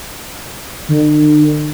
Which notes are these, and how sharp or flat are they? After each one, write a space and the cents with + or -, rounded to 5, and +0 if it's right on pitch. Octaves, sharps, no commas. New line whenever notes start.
D3 +45